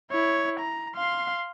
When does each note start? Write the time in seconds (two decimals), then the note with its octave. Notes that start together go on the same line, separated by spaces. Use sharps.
0.11 E4 C#5
0.60 A#5
0.96 F5 C6